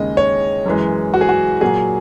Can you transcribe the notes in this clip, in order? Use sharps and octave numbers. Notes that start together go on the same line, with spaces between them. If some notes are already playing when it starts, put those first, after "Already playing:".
Already playing: D#2 C#3 G#3 D#5
C#5
F#2 E3 G#3
F#4
G#4
F#4
A#2 F#3 G#4